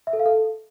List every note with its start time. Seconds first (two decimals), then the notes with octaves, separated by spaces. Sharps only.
0.07 E5
0.13 A4
0.19 F5
0.26 A4